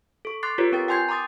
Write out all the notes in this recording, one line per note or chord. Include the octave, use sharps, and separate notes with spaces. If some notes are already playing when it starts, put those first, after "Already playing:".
A4 C#6
C6 D6 F#6 A6 C7
F4 G4 A4 B4 C#5
C4 A#4 G5 A6
G5 G#5 C6 G6 G#6 C7
A#5 C6 D6 D#6 A6